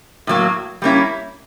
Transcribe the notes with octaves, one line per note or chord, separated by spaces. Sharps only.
A2 F#3 A#3
G3 A#3 C#4 E4